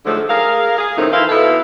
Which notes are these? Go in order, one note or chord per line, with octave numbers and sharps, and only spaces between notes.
G#2 D3 F3 F#3 A3
G#4 A#4 F5
G#4
F#2 A2 D#3 F3 C4 D#4
E3 E4 A#4 C5 F5
B2 E4 A4